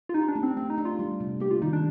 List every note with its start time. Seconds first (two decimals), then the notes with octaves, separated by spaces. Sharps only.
0.09 F4
0.14 D#4 G4
0.28 D4
0.35 A3
0.43 C4
0.57 A3 C4
0.70 D#4
0.78 D4
0.85 F4
0.99 G3
1.20 C3
1.40 A#3 G4
1.51 F4
1.62 D#3 D#4
1.73 D4